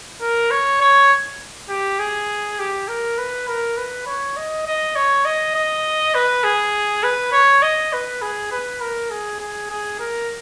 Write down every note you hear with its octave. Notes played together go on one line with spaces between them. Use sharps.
A#4
C#5
C#5
G4
G#4
G4
A#4
B4
A#4
B4
C#5
D#5
D#5
C#5
D#5
D#5
B4
G#4
B4
C#5
D#5
B4
G#4
B4
A#4
G#4
G#4
G#4
A#4